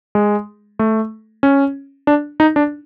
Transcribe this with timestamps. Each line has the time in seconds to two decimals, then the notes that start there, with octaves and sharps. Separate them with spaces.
0.15 G#3
0.79 A3
1.43 C#4
2.07 D4
2.40 D#4
2.56 D4